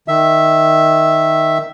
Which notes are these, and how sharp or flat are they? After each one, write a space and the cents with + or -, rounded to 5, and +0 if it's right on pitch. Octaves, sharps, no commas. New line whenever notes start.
D#3 +0 E5 +0